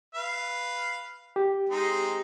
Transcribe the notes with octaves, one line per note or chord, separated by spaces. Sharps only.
B4 F5
G4
G#3 C4 D#4